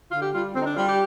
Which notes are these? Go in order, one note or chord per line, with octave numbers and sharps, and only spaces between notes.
D3 F4
G4
G3 F4
D3 C4
D#4
D4
G3 F4
G4